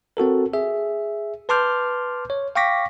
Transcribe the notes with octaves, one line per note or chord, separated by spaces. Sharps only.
C4 F#4 A4 A#4
G#4 E5
B4 A5 C6 D6 F6 G6
C#5
F5 G5 C#6 D6 A#6 B6